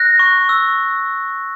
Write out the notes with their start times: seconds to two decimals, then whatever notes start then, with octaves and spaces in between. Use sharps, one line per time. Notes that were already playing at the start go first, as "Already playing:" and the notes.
Already playing: F#6 A#6
0.19 C#6
0.49 E6